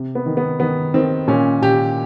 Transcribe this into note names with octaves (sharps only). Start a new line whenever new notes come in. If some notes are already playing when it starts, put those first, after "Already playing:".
Already playing: C3
B3
D#3
B3
D#3 B3
D#3 C4
A#2 C#4
A#2 G4